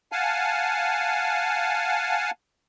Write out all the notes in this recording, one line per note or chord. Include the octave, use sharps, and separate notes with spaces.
F5 F#5 G#5 A5